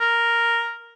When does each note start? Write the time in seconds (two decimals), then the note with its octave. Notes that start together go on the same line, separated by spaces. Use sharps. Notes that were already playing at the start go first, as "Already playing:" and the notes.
0.01 A#4